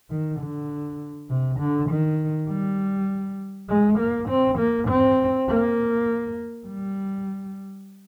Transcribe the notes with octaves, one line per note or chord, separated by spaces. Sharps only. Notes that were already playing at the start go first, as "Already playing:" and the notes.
D#3
D3
C3
D3
D#3
G3
G#3
A#3
C4
A#3
C4
A#3
G3